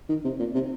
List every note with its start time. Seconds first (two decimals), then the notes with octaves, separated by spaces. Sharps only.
0.09 D#3
0.24 C3
0.40 A#2
0.55 C3